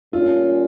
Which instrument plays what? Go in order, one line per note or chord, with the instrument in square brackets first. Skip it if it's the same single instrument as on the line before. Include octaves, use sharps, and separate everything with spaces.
[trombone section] A#2 G3 C#4 [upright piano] F4